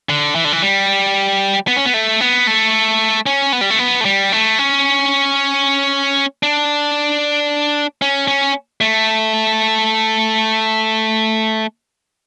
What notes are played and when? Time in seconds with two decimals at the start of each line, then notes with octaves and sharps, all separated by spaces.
0.09 D3
0.35 E3
0.45 D3
0.52 E3
0.62 G3
1.68 B3
1.76 C#4
1.85 B3
1.94 A3
2.21 B3
2.47 A3
3.26 C#4
3.52 B3
3.61 G3
3.70 A3
3.79 B3
4.01 A3
4.05 G3
4.32 A3
4.59 C#4
6.43 D4
8.02 C#4
8.28 C#4
8.81 A3